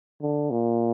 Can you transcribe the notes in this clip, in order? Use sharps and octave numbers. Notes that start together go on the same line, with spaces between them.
D3
A#2